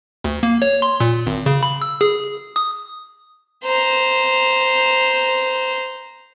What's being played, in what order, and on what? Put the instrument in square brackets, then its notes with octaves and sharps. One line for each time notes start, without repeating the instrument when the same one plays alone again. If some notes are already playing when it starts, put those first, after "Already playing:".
[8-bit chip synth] D2
A#3
C#5
C6
A#2
G#1
C#3
B5
E6
G#4
D#6
[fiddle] C5 A#5